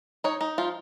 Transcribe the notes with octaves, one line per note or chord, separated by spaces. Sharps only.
D#4 C#5
D#4
F3 F4